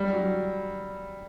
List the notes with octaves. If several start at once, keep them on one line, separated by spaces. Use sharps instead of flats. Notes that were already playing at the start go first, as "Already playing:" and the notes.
Already playing: G3
F#3